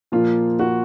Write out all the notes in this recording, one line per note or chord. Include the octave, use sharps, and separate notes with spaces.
A#2 F3 A#3 F4
F#4